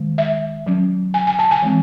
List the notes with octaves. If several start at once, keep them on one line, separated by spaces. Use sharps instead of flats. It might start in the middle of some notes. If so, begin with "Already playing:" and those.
Already playing: D#3 G#3
E5
F#3 C#4
G#5
G#5
A5
G#5
E3 G#3 C4